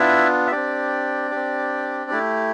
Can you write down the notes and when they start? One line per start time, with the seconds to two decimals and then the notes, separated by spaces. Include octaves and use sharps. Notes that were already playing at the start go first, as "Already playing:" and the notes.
Already playing: B3 D4 E4 F4 E5
0.47 E5
0.52 C4 D4 G4 D5
1.31 C4 G4
2.11 A3 E4 G4